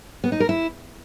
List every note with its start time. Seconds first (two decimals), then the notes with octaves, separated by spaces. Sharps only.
0.24 B3
0.32 D#4
0.40 A#4
0.49 E4